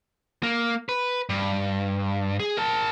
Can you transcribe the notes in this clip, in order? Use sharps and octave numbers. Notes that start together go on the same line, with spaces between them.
A#3
B4
G2
G#4
A#4 A5